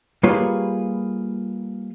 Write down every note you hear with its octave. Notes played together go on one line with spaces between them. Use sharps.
G3 A#3 F4 G#4 B4 C#5